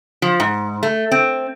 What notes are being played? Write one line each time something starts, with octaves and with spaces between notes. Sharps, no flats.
F3
G#2
A3
C4